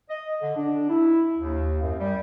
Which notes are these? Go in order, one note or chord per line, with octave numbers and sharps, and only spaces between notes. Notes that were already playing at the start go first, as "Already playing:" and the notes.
D#5
D3
D4
E4
D#2
F#2
G3